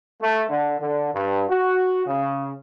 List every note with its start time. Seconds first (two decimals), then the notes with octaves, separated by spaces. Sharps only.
0.21 A3
0.50 D3
0.80 D3
1.12 G2
1.49 F#4
2.06 C#3